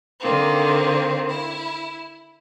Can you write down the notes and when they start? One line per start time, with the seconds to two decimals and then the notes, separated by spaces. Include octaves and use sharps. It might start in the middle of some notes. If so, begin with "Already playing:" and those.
0.19 D3 D#3 A#3 C4
1.27 E4